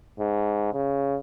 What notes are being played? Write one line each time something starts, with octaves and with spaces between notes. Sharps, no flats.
G#2
C#3